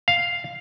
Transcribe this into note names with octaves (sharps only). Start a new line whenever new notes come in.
F5